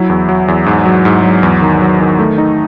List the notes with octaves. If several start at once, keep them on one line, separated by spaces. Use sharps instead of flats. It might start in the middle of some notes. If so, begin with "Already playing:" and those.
Already playing: F#3 E4
E2
F#3
E2
G#2
F#3
G#2
F#3
E2
D#3
F#3
D#3
A3
D#4